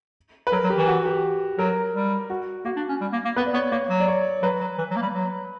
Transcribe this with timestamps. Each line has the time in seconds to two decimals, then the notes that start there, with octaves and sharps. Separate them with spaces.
0.47 B4
0.52 F#3 A#4
0.64 F#3
0.70 G4
0.75 E3
0.88 F#4
1.05 G4
1.58 F#3 A#4
1.94 G3
2.30 F#4
2.65 A#3 F#4
2.77 D4
2.89 C#4
3.01 G3
3.13 A#3
3.25 A#3
3.36 B3 B4
3.46 D5
3.54 B3 C#5
3.72 A#3 C#5
3.90 F#3
4.00 D5
4.08 C#5
4.43 F#3 B4
4.61 F#3
4.78 E3
4.91 F#3
4.96 A#3
5.02 G3
5.14 F#3